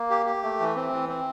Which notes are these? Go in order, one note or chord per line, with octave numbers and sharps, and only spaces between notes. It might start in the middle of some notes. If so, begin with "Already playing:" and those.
Already playing: A#3
G4
G4
A3
E3
C4
E3
C4